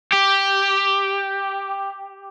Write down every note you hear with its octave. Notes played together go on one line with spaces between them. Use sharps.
G4